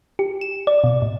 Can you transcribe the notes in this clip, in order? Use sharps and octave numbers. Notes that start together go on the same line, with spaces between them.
G4
E7
D5
B2
A2